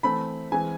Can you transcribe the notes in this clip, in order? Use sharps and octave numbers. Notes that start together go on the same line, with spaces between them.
E3 A3 C4 B5
E3 G#3 C4 G#5